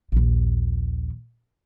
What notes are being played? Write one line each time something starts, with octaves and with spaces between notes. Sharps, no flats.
A#1 D#2